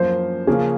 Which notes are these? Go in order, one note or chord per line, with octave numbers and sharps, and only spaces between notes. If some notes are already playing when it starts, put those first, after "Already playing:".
Already playing: F#2 F3 A#3 C5
C#3 F3 A#3 C#4 G#4